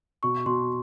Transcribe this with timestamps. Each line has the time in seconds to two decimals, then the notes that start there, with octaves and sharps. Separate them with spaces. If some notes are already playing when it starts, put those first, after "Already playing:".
0.23 B2 C#6
0.46 B2 C6